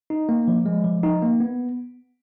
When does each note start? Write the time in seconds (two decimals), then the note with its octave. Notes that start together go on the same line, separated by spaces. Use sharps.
0.10 D#4
0.29 A#3
0.48 F3
0.66 G#3
0.85 F3
1.04 D#4
1.22 A#3
1.40 B3